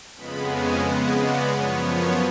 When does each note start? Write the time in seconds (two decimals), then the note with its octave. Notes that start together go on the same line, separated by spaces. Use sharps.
0.15 F2 C#3 G#3 B3 B5
0.50 G#5
0.84 C#3 G#3 B3 F#5
1.18 D5
1.53 F#2 F3 B3 C#5
1.88 C#5